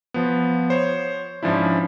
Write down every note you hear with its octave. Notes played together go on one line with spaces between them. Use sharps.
F3 B3
C5 C#5
G#2 F3 C#4 D4 E4